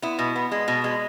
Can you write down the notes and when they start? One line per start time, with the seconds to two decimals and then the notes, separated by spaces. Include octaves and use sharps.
0.02 B3 E4
0.19 B2
0.36 B3
0.52 G#3
0.68 B2
0.84 G#3